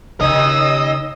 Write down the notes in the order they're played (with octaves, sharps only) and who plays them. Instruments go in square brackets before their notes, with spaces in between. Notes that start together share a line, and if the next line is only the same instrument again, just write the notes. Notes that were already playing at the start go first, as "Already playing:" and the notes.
[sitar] D#2 C#4 D#4 [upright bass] C#3 [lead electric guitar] D#5 [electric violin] D#6 E6